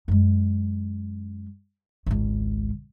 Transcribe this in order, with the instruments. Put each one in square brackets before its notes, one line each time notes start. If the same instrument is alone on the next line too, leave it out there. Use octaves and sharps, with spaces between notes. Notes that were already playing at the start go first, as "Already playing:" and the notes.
[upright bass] F#2 G#3
G#1 C#2